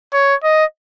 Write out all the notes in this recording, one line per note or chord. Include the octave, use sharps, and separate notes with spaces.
C#5
D#5